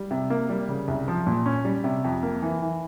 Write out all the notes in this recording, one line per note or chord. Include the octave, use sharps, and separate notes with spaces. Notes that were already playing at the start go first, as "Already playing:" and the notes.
Already playing: G3
C3
A#3
G3
C#3
C2
F3
A#2
C#4
G3
C3
F2
A#3
E3
E3